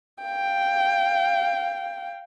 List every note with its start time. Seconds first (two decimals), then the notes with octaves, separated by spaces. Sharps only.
0.23 F5 G5